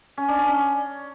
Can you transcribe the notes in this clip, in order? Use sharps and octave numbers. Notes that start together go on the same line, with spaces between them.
C#4
D4
C#4